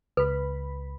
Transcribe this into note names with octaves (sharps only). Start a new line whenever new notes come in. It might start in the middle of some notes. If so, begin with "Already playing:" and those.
C#2 B4 B5